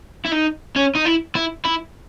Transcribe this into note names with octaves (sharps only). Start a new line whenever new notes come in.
E4
D#4
C#4
D#4
E4
E4
E4